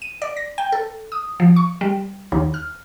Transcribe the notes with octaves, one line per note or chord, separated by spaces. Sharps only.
D#7
D5
A#6
G5
A4
D#6
F3
C#6
G3
D#2
F6